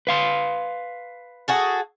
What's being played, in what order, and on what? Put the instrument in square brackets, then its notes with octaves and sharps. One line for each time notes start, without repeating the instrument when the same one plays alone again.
[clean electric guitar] B4 F5 C6
[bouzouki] F#4 G#4 A4